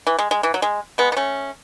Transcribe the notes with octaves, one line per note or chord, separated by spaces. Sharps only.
E3
G#3
G#3
E3
F#3
G#3
G#3 B3
B3
A3 C#4